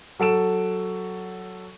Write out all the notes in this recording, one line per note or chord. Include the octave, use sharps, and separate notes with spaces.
F#3 A4 D7 E7